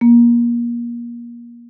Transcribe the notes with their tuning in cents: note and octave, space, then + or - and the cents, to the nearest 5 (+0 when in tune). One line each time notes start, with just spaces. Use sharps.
A#3 +30